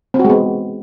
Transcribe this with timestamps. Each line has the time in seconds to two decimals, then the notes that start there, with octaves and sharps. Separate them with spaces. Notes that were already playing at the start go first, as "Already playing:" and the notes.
0.14 C4
0.19 F#4
0.25 G#3
0.30 B3